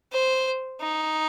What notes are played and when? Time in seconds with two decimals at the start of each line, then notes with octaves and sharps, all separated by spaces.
0.12 C5
0.81 D#4